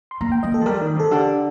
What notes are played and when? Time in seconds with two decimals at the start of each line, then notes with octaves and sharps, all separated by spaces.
0.11 C6
0.21 A#3 A#5
0.32 G5
0.43 A#3 D#5
0.54 A4
0.61 F3
0.66 G3 A#4
0.81 D#3
0.96 C3 A4
1.11 D3 G4